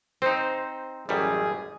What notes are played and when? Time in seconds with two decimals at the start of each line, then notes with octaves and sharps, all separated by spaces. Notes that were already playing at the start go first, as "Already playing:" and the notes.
0.22 C4 D#4 C5
1.09 A1 F#2 G3 G#4